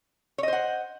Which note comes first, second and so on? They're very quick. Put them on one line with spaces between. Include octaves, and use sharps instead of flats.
C#5 D#5 C5 F#5